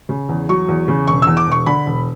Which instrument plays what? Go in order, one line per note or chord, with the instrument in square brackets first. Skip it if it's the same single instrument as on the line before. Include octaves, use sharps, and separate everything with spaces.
[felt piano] C#3
E2
F#3 C#6
E2
C#3
E1 C#6
E2 E6
D6
E1 C#6
D3 B5
E1